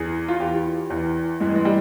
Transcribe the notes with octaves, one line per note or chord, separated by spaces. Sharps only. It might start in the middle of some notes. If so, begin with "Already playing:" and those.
Already playing: E2 E3 G#4
F4
E2 E3 G4
E2 E3
G2 E3 G#3
G#3
G3